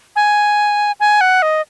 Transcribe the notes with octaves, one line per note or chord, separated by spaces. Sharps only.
G#5
G#5
F#5
D#5